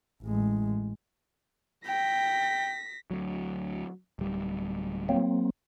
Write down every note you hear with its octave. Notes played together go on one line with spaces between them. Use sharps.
A1 G#3
G5 A#6 B6
D2 F#3
D1 G3
F#3 A#3 C4